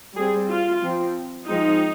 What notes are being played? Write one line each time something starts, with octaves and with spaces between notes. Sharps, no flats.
G3 C4 G#4
F4
F3 C4
F3 G#3 C4 D#4